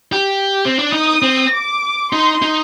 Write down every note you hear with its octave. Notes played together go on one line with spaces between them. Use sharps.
G4
C4
D4
D#4 D#6
C4
D6
D#4 C6
D#4